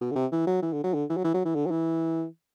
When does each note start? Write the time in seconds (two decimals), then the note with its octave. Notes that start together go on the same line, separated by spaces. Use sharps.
0.01 B2
0.11 D3
0.15 C3
0.32 E3
0.47 F#3
0.62 E3
0.73 D3
0.84 F#3
0.94 D3
1.09 E3
1.17 F#3
1.24 E3
1.34 F#3
1.45 E3
1.55 D3
1.66 F#3
1.71 E3